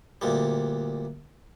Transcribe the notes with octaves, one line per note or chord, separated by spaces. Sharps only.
D2 A#2 G3